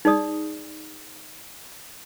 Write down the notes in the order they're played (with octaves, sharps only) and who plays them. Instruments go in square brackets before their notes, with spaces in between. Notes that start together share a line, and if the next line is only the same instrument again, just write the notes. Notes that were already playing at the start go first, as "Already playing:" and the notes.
[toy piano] D#4 G#4 D5 D#6